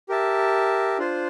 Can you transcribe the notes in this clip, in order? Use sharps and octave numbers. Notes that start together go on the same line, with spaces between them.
G4 A#4 E5 A5
D4 F4 C5